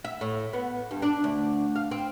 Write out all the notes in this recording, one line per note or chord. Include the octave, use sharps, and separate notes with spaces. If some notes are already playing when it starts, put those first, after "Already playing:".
E5
A2
B3
G2
D4
D2
F5
C4